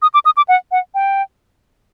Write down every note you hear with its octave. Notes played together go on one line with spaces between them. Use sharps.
D#6
D6
D#6
D6
F#5
F#5
G5